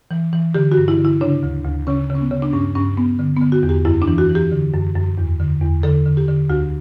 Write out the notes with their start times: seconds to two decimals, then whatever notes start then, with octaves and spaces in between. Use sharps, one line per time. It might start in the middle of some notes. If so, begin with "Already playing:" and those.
0.11 E3
0.33 E3
0.55 D3 G4
0.72 F#4
0.78 G2
0.88 E4
0.99 D3
1.05 E4
1.21 C#3 D4
1.43 D2
1.65 D2
1.87 C#3 C#4
2.10 C#3
2.15 C#4
2.21 B3
2.31 C#3
2.42 D4
2.53 G2 C#4
2.75 G2 C#4
2.97 G2 B3
3.19 D3
3.36 D3 B3
3.52 F#4
3.63 E2
3.69 G4
3.85 F#2 E4
4.02 D4
4.08 E3
4.18 F#4
4.29 E3
4.35 G4
4.51 D3
4.73 F#2
4.95 F#2
5.18 E2
5.40 D3
5.61 E2
5.83 D3 A4
6.06 D3
6.17 G4
6.28 D3
6.50 D2 F#4